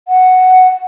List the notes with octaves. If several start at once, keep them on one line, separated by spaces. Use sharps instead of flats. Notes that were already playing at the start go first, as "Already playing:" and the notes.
F#5